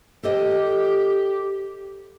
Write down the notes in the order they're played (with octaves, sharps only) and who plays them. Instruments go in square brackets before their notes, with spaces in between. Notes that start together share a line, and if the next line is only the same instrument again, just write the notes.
[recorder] G4 [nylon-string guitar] A4 C5 D#5